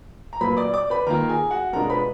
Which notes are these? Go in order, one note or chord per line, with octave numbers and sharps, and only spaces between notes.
A#5
A#2 F#3 A#3 B4 B5
D5 D6
D5 D6
B4 B5
D#3 A#3 F4 A#4 A#5
G#4 G#5
F#4 F#5
B2 G#3 D4 F4 A#4 A#5
B4 B5